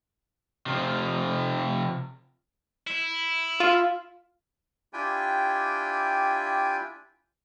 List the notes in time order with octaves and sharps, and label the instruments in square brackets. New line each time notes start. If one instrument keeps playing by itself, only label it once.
[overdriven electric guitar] C3 F3
[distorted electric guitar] E4
[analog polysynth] F4
[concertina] D4 E4 F4 G4 G5 G#5